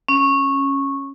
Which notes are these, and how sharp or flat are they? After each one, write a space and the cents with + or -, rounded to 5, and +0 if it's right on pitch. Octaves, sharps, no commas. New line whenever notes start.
C#4 -10